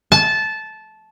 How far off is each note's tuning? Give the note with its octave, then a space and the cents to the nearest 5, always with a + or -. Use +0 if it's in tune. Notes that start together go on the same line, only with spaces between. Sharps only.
A5 -15